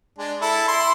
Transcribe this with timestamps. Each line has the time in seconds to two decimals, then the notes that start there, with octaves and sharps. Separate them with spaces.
0.19 G#3 D4
0.41 E4 A4
0.68 E4 C6